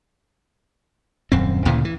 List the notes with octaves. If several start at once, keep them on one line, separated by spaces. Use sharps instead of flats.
D#1 F#2 C4
D2 A#2 C#3 E3
E3